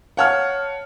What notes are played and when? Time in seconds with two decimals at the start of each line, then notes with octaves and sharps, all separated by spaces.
0.17 C#5 F5 F#5 A5 F6